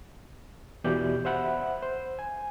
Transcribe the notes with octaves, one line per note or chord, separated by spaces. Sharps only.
E2 B2 E3 G4 D5 G6
C5 E5 F#5 B5
C5
G#5